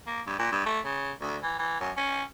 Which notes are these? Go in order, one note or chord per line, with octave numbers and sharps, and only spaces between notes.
A#3
G2
A#2
G2
A3
C#3
D2
E3
E3
F#2
C#4